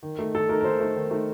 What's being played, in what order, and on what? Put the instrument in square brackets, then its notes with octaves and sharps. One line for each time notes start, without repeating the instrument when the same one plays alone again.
[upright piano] D#3
A3 D#4
D#3 A4
A3 D#4 A#4
A#4
D#3 C5
A3 D#4
D#3
A3 D#4